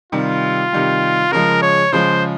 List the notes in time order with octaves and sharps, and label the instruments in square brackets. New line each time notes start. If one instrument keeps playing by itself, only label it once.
[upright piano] C3 D#3 G3 [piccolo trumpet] F4
[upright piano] C3 D#3 G3
[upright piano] C#3 F3 G#3 [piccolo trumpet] A#4
[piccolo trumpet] C#5
[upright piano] C#3 F3 G#3 [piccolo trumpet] C5